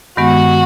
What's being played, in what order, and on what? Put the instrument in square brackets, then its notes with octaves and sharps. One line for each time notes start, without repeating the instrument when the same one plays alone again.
[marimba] G2 D#3 G#3 B3 [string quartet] F#4